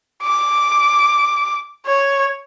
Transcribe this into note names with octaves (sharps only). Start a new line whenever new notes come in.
D6
C#5